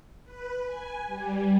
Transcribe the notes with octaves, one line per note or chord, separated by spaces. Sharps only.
B4
G#5
G3